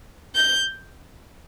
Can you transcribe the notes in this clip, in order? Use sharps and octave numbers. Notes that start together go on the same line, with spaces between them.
G6